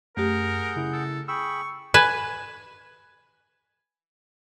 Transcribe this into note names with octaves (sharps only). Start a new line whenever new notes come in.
F#2 A3 G4 G#4 A#4 F#5 G6
C#3 E4
A4
G#4 G5 B5 C#6 E6
B4 G#5